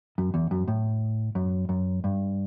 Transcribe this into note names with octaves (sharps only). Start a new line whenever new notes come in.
F#2
E2
F#2
A2
F#2
F#2
G2